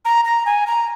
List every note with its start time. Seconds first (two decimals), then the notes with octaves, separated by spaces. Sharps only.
0.05 A#5
0.25 A#5
0.46 G#5
0.67 A#5